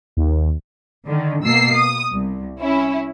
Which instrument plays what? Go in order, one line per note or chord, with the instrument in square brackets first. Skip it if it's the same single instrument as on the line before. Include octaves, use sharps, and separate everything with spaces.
[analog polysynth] D#2
[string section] D3 D#3
B2 A#3 E6 C7
D#6
C2
C#4 E4